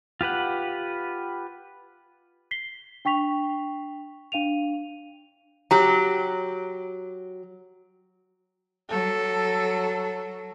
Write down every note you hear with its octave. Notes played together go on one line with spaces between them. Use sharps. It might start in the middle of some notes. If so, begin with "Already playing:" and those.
F4 G4 B4 F#5
B6 C7 G7
D4 G5 C#6 B6 F7
D4 F5 D#7 F7
F#3 G4 A#5
F#3 A4